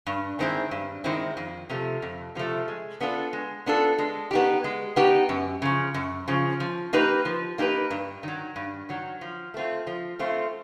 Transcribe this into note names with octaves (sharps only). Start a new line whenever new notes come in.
G2
D#3 G#3 C4 E4
G2
D#3 G#3 C4 E4
F2
C3 F3 A3
F2
C3 F3 A3
G#3
B3 D4 F4 A4
G#3
B3 D4 F4 A4
G#3
B3 D#4 G4
G#3
B3 D#4 G4
F#2
C#3 F3
F#2
C#3 F3
F3
A#3 D#4 G4 B4
F3
A#3 D#4 G4 B4
G2
D#3 F#3
G2
D#3 F#3
F3
A3 C4 F4
F3
A3 C4 F4